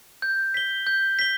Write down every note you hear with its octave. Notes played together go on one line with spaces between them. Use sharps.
G6
B6 G7
G6
B6 G7